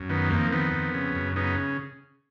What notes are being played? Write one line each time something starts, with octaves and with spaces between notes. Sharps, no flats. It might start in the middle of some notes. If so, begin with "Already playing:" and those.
Already playing: F#2
D#3 B3
F2 A#3
D#3 B3
F2
C#3
F#2
C#3 B3 D#4